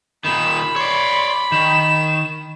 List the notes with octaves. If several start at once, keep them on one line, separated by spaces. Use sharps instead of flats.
A#2 D#3 B5 E7
C#5 D5 C6
D#3 E7